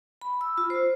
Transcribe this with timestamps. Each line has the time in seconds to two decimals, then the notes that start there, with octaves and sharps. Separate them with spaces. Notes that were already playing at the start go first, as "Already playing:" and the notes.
0.21 B5
0.41 E6
0.58 F4
0.70 C5